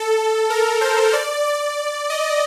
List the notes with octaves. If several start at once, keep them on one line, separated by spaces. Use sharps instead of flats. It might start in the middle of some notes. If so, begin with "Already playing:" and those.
Already playing: A4
A#4
C5
D5
D5
D#5